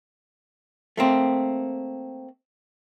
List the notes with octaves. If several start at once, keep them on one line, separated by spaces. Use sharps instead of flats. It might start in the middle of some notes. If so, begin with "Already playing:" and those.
A3 A#3 C4